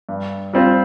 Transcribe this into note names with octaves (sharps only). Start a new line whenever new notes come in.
G2
G3 C4 F4 C5